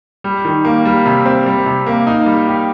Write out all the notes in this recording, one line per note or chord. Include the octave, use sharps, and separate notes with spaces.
G3
D#3
A#3
G3
C3
C4
G3
C3
A#3
D#4
G3
G4